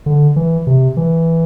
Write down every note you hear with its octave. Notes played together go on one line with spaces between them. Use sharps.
D3
E3
C3
E3